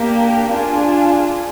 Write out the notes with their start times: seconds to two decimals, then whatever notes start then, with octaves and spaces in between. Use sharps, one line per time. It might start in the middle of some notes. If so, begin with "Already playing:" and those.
Already playing: A#3 D4 G4
0.51 D4 F4 G#4